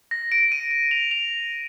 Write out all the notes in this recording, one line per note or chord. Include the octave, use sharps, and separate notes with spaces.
A#6
D7
D#7
D#7
F7
F7